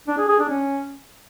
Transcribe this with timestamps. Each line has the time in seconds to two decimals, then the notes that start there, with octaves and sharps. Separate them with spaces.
0.08 D4
0.18 G#4
0.29 G#4
0.39 D4
0.49 C#4